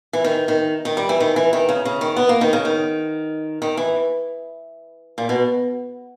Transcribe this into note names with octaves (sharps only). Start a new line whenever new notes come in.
E3
D#3
D#3
D#3
G3
E3
D#3
E3
D#3
C#3
C#3
D#3
B3
A#3
D#3
C#3
D#3
D#3
E3
A#2
B2